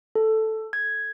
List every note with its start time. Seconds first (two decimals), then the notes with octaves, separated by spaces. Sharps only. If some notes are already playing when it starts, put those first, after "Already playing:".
0.15 A4
0.73 G#6